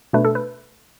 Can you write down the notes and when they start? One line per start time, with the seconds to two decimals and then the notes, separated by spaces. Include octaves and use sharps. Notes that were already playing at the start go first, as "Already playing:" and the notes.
0.13 B2 A3 D4 B4
0.25 A4
0.35 B4